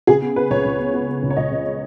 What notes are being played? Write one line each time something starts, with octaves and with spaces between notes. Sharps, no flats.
C#3 G#4
B3
B3 B4
C#2 C#5
C#2
B3
B3
B3
C#2
C#5
C#2 D#5
C#3